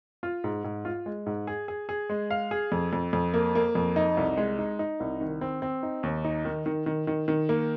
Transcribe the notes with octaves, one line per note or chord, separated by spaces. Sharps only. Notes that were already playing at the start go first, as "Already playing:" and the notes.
F4
G#2
G#2
F4
G#3
G#2
G#4
G#4
G#4
G#3
F5
G#4
F2
F2
F2
A#3
A#3
F2
D#4
C2
G#3
D#4
D#4
C2
D#3
C4
C4
D#4
D#2
D#4
D#3
D#3
D#3
D#3
D#3
A#3